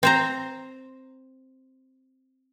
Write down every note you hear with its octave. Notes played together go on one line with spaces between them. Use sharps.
C4 C5 A#5